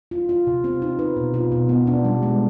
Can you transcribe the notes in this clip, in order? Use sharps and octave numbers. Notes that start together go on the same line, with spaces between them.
F4
F4
C3
C4
D#4
B4
B2
F4
B2
B3
D4
G3
G#3